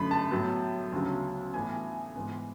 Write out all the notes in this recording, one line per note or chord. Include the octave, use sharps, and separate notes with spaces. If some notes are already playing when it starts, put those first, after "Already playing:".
Already playing: F#2 D3 A3 B5
A5
A2 F#3 B3
D2 C#3 F#3 B3
A2 E3 B3 G#5
G#2 E3 B3